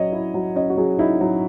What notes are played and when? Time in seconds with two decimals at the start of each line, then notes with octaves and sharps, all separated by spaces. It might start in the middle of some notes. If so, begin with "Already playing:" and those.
Already playing: F#3 C#4 C#5 D#5
0.12 E4
0.34 F#3
0.55 C#4 D#5
0.70 F#4
0.77 F#3 G#4
0.99 D#4 E4
1.20 F#3 D#4